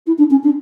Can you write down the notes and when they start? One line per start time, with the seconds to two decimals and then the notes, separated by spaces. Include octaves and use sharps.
0.06 E4
0.18 D4
0.30 C#4
0.43 D4